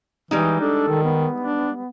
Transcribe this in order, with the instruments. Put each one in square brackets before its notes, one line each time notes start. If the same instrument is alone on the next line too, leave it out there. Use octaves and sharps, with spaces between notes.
[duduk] E3 [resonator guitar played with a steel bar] G3 G#3 D#4
[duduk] D4 [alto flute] A4
[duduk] D#3
[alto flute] B3
[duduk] D4